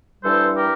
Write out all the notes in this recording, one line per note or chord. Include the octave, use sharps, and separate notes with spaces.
G2 E3 G3 A4 C5
G4 A#4